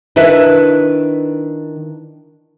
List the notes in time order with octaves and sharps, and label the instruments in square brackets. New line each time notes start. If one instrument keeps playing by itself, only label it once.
[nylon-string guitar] D#3 D4 E4 B4 E5